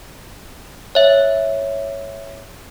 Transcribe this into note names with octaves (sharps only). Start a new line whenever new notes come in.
C#5 E5